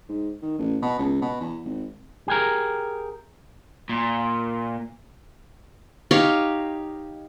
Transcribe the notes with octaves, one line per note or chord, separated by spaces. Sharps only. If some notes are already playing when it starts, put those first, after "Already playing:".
G#2
D#3
A1
B2
C#2
B2
E2
G#1
G4 G#4 A#4
A#2
D#4 G4 C#5 F5